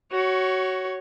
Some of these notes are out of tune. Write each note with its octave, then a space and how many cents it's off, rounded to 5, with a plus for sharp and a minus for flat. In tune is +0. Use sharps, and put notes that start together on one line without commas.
F#4 +20 C#5 +0